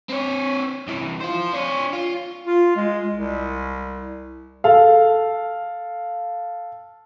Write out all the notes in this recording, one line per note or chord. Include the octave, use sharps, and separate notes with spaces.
C4 C#5
C2 E3
F4 C5
D4 C#5
F4
F4
G#3
C2
A4 F5